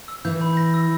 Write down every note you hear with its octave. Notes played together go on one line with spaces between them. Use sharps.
E6
E3 G6
B5
A#6
E6